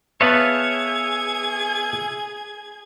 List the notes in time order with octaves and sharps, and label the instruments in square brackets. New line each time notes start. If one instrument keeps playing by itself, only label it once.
[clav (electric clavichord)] B3 B4 A5 [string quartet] G#4 G#6 [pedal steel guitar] C#5 E5 F5